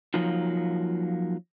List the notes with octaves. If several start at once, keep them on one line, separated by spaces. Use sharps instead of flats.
F3 F#3 A#3 D#4 F4